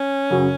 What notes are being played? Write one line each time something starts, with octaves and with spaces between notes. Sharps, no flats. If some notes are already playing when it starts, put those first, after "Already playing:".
Already playing: C#4
F#2 C#3 F#3